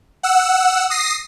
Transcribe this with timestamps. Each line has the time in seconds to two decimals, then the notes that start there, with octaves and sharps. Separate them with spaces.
0.23 F#5 E6
0.90 D#6 A#6 C7